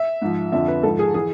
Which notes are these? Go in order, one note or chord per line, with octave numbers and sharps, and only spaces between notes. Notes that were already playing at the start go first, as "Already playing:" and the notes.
Already playing: E5
G#2 F3
F2 D3 F3 E5
B4
G#2 F3 A4
G#4
E3 G#4